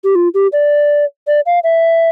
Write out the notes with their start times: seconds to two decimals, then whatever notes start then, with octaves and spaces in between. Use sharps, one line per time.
0.04 G4
0.15 F4
0.34 G4
0.52 D5
1.27 D5
1.46 F5
1.64 E5